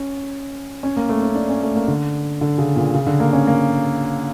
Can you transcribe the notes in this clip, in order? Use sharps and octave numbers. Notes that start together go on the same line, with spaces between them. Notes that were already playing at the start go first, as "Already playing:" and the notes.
Already playing: C#4
C#4
A#3
A3
C#4
D4
C#4
A3
A#3
D3
D3
C#3
A#2
C#3
D3
A#3
C#4
A#3